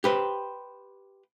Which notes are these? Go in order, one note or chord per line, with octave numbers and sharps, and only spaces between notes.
G4 B4 C5